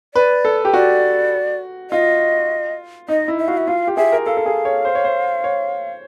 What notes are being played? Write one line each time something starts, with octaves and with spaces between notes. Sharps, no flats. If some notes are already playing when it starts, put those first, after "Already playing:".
B4 D5
A4
G4
F#4 D5
F4 D#5
D#4 D#5
E4
E5
F#4 F5
E5
F4 F5
G4
G#4 E5
A#4
A4 F5
A4
G#4
C#5
C5
C#5
C5
C#5